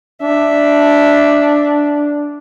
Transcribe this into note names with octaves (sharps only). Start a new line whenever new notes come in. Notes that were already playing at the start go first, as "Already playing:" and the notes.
D4 E5